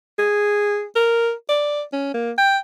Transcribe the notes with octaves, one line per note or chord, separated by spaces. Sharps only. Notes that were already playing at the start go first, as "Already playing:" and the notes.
G#4
A#4
D5
C#4
A#3
G5